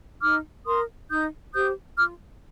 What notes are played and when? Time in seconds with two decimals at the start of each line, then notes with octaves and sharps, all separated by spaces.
0.21 D#4 D6 F6
0.66 A#4 C6 D#6
1.10 D#4 D#6 G6
1.54 G4 C5 D#6 G6
1.98 F4 D6 F6